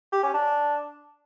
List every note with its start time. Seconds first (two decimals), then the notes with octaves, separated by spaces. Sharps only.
0.12 G4
0.23 C#4
0.34 D4